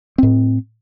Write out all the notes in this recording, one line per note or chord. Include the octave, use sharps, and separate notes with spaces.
A2 C4